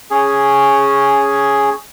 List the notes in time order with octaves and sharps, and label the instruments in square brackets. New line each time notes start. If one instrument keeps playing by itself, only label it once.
[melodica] C#4 G#4